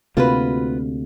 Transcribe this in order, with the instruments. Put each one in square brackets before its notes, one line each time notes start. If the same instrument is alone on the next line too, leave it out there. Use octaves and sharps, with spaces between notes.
[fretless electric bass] D2 C3 A#3 [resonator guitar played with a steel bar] F4 F#4 B4